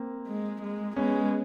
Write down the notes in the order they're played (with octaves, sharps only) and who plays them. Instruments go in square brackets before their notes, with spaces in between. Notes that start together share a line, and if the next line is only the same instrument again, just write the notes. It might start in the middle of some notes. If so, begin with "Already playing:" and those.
Already playing: [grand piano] A#3 C4
[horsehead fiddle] G#3
G#3
[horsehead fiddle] G#3 [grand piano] B3 C#4